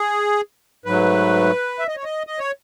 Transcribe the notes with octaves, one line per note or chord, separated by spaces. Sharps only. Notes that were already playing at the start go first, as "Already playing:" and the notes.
Already playing: G#4
G#2 F#3 A3 B4
E5
D#5
C#5
D#5
D#5
C#5